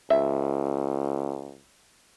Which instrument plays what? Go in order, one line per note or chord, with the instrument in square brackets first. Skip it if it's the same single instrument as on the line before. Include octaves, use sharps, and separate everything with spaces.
[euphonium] C#2 [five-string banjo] E5